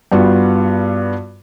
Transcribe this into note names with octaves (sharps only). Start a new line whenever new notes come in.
G2 G3 B3 F4 F#4